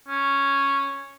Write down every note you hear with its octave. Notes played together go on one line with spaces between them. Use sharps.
C#4